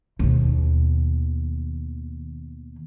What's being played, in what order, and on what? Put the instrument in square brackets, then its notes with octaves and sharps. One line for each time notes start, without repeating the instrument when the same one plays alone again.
[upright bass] D#2 B2